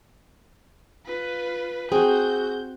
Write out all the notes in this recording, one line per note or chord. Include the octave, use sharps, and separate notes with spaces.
F4 B4
C4 F#4 G#4 G6